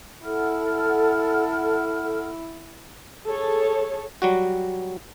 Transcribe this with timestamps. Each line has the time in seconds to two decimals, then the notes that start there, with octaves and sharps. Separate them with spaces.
0.25 E4 A4 F#5 F6
3.27 G#4 A4 C#5 A5
4.22 F#3 G3 F#4